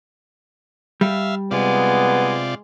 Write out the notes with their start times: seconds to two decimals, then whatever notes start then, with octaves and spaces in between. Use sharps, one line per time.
1.01 G3 E5 F5
1.51 C3 G#3 B3 F4 D5